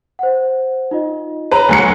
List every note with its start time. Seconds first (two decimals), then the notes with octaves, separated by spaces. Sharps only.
0.19 C5 F#5
0.91 D#4 F4 D#5
1.51 B4 C#5 A#5
1.69 D2 F#3 C#7